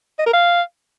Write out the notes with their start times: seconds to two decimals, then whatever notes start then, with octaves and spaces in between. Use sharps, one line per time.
0.19 D#5
0.26 A#4
0.34 F5